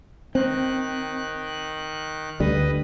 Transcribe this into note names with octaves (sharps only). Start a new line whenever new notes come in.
D#3 C4 F#6
D2 D3 G3 B4 D#5